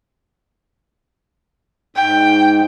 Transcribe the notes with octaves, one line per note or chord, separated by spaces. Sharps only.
G#2 G5